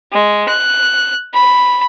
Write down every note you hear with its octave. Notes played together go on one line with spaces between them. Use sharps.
G#3
F#6
B5